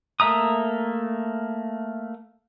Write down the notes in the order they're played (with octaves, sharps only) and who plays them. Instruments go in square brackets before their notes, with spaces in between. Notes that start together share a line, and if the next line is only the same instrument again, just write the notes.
[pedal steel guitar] A3 A#3 E5 A#5 D#6